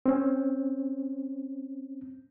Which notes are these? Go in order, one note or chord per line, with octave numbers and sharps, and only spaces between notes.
C4 C#4